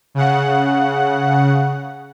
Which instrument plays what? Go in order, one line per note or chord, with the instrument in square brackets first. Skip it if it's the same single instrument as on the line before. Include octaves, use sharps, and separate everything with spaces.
[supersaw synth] C#3 F#5